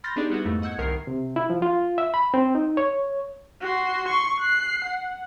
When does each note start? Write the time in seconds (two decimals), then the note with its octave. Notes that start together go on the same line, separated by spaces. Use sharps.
0.04 B5 C6 F6 G6 A6 A#6
0.16 B3 D4 D#4 G4 G#4 D5
0.30 G3 B3 E4 F#4
0.45 F2 G#2 A3
0.62 D#5 F#5 E6 G6 G#6 C#7
0.78 C2 D#3 A#4 C7
1.07 C3
1.36 E4
1.50 F3
1.62 F4
1.98 E5
2.14 B5
2.34 C4
2.55 D#4
2.77 C#5
3.61 F#4 C6
4.08 C6 C#6
4.40 F#6 C7
4.84 F#5